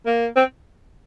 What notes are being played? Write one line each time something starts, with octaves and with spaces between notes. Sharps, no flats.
A#3
C4